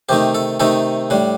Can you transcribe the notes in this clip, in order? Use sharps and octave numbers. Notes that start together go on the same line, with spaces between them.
C3 D#3 A3 D#4 G4
A4
C3 D#3 A3 D#4 A4
A2 G3 D4